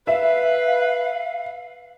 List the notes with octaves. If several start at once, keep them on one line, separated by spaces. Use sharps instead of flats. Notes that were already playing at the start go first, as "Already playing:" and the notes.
B4 E5 F5